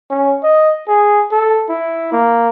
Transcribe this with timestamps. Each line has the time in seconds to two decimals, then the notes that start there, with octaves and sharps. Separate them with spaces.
0.10 C#4
0.43 D#5
0.88 G#4
1.32 A4
1.69 E4
2.12 A#3